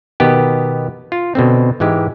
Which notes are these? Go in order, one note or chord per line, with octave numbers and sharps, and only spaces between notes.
B2 D#3 B3 G4
F4
B2 D3 C4
G#2 E3 G#3 G4